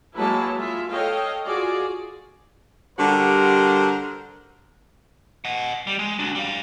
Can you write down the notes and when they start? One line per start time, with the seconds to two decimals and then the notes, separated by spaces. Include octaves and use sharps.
0.15 F#3 G#3 A#3 E4 B4 A5
0.57 G#3 F4 E5
0.91 A4 C#5 D#5 F5 G5
1.46 F4 F#4 G#4 D5
2.98 D3 G3 F#4 G4 A#4 C5
5.45 D#5 F#5
5.87 G3
5.99 G#3
6.19 D4 F#4
6.35 G3 F5